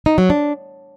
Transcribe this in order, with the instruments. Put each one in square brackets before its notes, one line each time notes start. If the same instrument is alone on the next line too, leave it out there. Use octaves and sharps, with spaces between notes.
[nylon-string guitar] D#4
F#3
D4